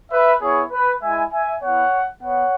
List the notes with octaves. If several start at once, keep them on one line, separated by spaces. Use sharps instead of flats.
B4 E5
B3 E4 G#4 C#5
B4
G#3 E4 E5 G#5
E5 G#5
B3 E4 C#5 F#5
B3 C#5 F#5